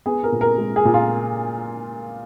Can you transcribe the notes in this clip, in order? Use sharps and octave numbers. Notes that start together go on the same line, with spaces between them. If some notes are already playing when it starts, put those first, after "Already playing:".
B3 G#4
A#4
A#2
A#4
G#3
G#4
A#2
F4